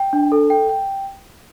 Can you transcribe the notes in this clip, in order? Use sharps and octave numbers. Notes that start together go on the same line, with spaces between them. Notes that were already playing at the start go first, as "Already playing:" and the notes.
Already playing: G5
D4
A4
G5
G5